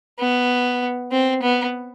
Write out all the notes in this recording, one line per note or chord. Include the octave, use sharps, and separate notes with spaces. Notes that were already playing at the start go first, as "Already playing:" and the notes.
B3
C4
B3